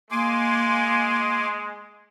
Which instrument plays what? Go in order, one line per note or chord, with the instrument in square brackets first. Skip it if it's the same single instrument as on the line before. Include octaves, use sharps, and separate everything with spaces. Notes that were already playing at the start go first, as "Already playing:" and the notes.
[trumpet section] G#3 [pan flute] A#3 [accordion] G#5 C6 D6